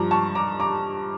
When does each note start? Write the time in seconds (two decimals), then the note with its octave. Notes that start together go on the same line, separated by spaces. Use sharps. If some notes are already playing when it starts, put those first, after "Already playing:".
Already playing: G2 F3 A#5 D6
0.11 A5 C#6
0.35 A#5 D6
0.60 A#5 D6